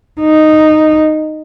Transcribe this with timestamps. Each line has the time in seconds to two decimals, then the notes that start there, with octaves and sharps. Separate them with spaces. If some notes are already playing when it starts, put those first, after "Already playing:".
0.21 D#4